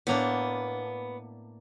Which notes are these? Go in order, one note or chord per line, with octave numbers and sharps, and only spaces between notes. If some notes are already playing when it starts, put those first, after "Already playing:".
A2 A#3 B3 D4